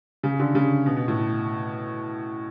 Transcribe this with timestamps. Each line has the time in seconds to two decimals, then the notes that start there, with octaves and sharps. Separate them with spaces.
0.23 C#3
0.40 D3
0.55 C#3
0.86 B2
0.96 B2
1.08 A2